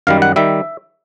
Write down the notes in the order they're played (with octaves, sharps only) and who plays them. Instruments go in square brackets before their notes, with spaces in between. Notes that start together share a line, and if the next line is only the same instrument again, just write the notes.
[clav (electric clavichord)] F#2 D#3 G3 F5
F#5
D#3 G3 E5